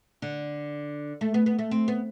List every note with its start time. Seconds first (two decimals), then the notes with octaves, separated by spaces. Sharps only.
0.22 D3
1.21 A3
1.34 B3
1.46 B3
1.59 A3
1.71 C4
1.88 B3